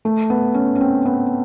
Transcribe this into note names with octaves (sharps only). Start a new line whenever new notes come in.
A3
B3
C#4
C#4
C4
B3